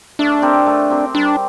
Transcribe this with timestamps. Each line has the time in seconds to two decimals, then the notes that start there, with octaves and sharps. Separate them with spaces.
0.19 A3 D4
0.42 C4 G4 A#4
0.66 A3
0.90 C4 G4 A#4
1.14 G3 D4